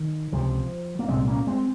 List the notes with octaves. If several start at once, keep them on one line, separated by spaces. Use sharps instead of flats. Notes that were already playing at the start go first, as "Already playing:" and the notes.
Already playing: D#3
C#2 C3 F3
A#3
C2 A#2 G#3 C4
C4
A#3 C#4
G#3 C4